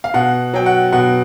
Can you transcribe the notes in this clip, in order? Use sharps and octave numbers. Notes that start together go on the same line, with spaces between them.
F5
B2 F#5
F#3 G5
F#5
B2 F#5